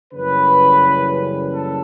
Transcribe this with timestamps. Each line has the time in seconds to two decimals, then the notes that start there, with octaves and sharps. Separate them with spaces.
0.14 F#2 C#3 E3 G3 A#3 B4
1.52 A4